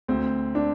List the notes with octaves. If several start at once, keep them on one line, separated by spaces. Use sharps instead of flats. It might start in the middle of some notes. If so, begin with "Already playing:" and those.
D2 C4
D4